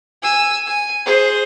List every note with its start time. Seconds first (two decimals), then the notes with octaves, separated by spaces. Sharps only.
0.22 G#5 E6
0.67 G#5
1.06 G#4 C5